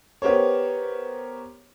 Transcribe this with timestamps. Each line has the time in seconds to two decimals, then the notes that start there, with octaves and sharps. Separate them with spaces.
0.22 B3 G4 A#4 C5 C#5